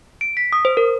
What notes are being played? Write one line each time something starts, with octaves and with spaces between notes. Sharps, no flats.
D7
B6
D#6
C5
A#4